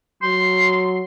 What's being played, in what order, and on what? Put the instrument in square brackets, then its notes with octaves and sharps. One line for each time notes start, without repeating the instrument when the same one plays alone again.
[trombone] F#3 [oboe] C6